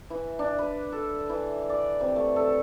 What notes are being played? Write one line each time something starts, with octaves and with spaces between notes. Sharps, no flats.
E3
D4
B4
A4
E3
D5
C3
A3
A4